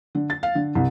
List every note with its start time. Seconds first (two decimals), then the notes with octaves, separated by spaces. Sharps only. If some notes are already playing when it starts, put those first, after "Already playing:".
0.15 D3
0.30 A6
0.43 F5
0.55 D3
0.75 C2